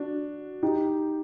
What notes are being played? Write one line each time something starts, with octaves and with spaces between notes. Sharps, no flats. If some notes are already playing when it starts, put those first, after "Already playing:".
Already playing: D4 F#4
D#4 G4